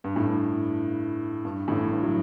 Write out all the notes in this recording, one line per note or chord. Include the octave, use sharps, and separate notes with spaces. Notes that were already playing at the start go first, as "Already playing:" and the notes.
G2
A2
G2
G2
A1 A2
G2
F#3